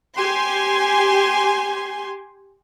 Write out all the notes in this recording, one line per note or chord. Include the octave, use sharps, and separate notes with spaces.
G4 G#5 C6